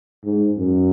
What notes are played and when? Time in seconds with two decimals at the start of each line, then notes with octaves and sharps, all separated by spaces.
0.24 G#2
0.57 F#2